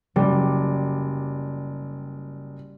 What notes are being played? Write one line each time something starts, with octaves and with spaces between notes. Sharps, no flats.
F#1 G3